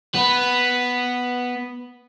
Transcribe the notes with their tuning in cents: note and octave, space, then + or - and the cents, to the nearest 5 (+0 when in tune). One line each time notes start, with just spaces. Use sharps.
B3 +0 B4 +0